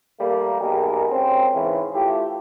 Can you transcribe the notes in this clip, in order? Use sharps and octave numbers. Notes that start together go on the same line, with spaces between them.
G3 A3 A#3
B1 G#3 G4 G#4 A#4
C#2 C#3 C4
G#2 C#3 E3
A3 E4 F4 G4